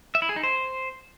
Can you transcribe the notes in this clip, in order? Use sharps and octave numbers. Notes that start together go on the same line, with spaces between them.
E5
E4
G#4
D#4
C5